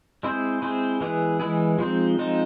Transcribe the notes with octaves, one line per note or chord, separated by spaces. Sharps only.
G#3 C4 E4 G#4 C5
G#3 C4 E4 G#4 C5
E3 G#3 B3 E4 G#4
E3 G#3 B3 E4 G#4
F3 G#3 C4 D#4
F3 G#3 C4 D#4